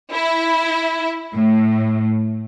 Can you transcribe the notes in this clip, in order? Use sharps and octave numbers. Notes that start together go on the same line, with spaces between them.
E4
A2